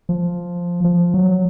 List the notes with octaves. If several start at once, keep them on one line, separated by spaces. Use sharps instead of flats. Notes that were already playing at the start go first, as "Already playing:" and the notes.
F3
F3
F#3